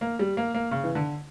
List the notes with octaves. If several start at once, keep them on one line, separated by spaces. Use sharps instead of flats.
A#3
G3
A#3
A#3
C#3
E3
D3